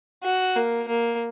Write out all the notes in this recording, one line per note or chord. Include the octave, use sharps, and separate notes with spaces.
F#4
A#3
A#3